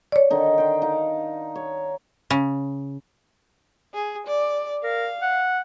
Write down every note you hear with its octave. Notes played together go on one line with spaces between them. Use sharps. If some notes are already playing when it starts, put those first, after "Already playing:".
C#5 D5
D3 D#3 D#4
G5 C6
D#4 F5 F#5
C#5
C#3
G#4
D5
A#4 F5
F#5